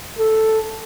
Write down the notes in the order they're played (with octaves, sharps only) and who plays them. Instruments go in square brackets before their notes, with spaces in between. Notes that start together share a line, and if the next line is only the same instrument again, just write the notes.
[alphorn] A4